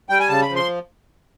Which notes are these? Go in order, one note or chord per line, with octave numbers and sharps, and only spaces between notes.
G3 G5
G#5
C#3 A5
B5
F3
C6